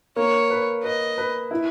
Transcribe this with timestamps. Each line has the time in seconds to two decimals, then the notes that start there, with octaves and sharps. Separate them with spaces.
0.16 A#3 C#5
0.50 B4
0.83 B4 D#5
1.18 B4
1.51 E4